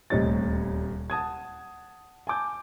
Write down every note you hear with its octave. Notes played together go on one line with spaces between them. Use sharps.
D#1 D2 C3 C#5 D#5 A6
F#5 A5 D#6 G#6
G#5 A5 D6 G6